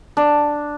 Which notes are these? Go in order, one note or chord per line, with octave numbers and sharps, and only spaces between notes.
D4